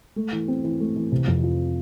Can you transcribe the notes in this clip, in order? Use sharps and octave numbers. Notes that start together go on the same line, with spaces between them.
A3
E3
C4
E3
A3
E3
C3
F2
F3